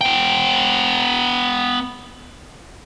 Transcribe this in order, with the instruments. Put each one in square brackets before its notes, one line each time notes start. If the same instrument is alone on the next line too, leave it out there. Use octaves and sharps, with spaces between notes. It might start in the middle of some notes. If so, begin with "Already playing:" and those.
[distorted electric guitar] B3 G5